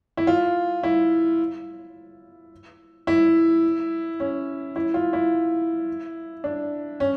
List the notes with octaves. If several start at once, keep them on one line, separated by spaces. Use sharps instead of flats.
E4
F4
E4
E4
C#4
E4
F4
E4
D4
C#4